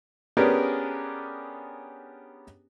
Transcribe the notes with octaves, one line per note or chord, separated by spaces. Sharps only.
B3 C#4 D4 G4 G#4 A#4